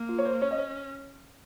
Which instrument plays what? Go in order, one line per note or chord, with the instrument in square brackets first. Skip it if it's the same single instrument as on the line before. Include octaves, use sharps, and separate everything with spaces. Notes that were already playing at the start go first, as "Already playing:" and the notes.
Already playing: [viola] A#3
[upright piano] F4
C#5
C5
[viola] C#4 [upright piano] C#5
[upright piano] D#5
C#5